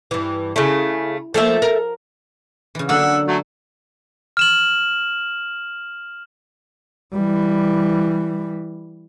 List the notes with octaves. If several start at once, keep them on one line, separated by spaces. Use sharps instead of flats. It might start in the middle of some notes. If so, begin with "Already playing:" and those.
G2 E3
C#3 A3 E4
F3 A3 A#3 A4 E5
A#4
C#3 E3
D3 F#3 A#3 F#5 E6
F#3 A3
F6 E7 F#7
E3 G3